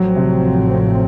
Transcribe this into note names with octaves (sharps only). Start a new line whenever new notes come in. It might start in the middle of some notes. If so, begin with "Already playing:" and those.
Already playing: A1 A2 F3 F#3 A3 C4
C3